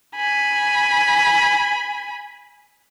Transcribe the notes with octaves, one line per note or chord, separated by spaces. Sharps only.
G#5 B5